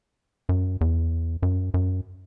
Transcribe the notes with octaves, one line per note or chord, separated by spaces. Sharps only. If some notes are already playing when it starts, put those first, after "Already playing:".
F#2
E2
F#2
F#2